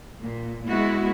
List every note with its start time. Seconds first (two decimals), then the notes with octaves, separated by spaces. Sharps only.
0.20 A#2
0.68 G#3 B3 E4 F#4